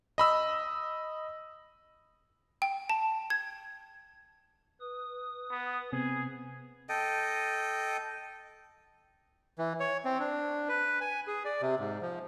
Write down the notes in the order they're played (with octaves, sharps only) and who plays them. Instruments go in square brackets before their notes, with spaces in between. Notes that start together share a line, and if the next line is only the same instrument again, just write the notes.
[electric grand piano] D#5 B5 E6
[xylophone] G5
A5
G#6
[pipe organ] B4 D#6
[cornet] B3
[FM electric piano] C3 B3 C4 [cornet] G#4
[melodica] A4 D#5 G5
[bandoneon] E3
C#5
C4
D4
B4
G#5
G#4
D5
C3
G#2
F3